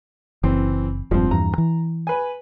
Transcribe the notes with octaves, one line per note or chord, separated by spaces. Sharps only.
F#1 E3 C4
E1 G2 F3 C4
E2 G2 A#5
E3
B4 G#5